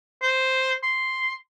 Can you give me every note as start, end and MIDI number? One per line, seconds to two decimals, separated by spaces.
0.22 0.75 72
0.83 1.34 84